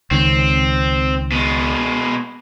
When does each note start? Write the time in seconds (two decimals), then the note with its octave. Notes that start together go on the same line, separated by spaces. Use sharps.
0.11 C#2 D#3 C4
1.32 B2 G#3